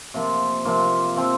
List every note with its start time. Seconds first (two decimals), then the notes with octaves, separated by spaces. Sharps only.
0.14 C3 F3 A#3 F4
0.65 C3 F3 A#3 F4
1.16 F3 C4